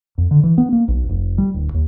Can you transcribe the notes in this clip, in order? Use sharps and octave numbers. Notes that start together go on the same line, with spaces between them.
F2
D3
E3
B3
A#3
B1
F1
G3
D1
D#2